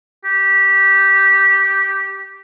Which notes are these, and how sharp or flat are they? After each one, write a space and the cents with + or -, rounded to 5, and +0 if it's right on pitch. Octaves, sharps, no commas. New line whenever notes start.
G4 -10